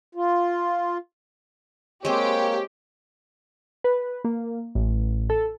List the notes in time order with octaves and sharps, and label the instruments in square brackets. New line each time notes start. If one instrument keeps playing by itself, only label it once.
[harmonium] F4
[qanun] G#3 C4 [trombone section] A#3 [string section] G4 [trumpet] C#5
[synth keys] B4
A#3
A1
A4